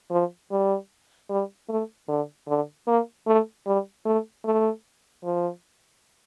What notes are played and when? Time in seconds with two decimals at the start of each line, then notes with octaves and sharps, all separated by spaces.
0.11 F3
0.51 G3
1.29 G3
1.69 A3
2.08 D3
2.48 D3
2.87 A#3
3.27 A3
3.66 G3
4.05 A3
4.45 A3
5.24 F3